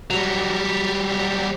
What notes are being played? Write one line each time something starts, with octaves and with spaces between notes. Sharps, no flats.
F#3 G3